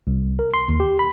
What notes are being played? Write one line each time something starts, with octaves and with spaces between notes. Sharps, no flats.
C2
A#4
C6
D#2
G4
B5